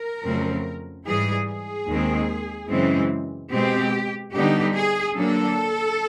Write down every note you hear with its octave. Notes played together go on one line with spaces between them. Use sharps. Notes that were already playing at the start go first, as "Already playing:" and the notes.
Already playing: A#4
F2 C#3 F#3 A3 C4
G#2 E3 G3 G#4
G#4
D#2 D#3 G#3 C4
F#2 C#3 E3 G#3 C4
B2 G#3 C4 G4
D3 G3 B3 D#4 G4
G#4
D3 F#3 A#3 D4 A4